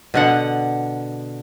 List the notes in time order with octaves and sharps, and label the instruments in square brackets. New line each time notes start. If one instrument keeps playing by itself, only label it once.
[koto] B2 D3 F#5